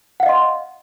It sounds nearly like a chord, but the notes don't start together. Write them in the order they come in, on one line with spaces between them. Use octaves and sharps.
F#5 F5 D#5 C6